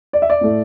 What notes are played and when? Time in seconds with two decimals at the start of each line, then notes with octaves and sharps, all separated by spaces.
0.13 D5
0.22 E5
0.30 D5
0.41 A2 A3